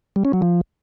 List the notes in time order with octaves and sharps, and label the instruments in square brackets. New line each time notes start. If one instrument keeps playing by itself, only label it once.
[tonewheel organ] G3
C#4
F#3
F3